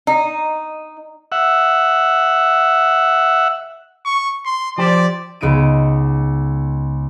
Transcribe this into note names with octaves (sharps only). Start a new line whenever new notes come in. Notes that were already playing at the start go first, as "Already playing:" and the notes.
D#4
E5 F#5
C#6
C6
F3 G4 C5 D5
C#2 B3 D#4 D7 D#7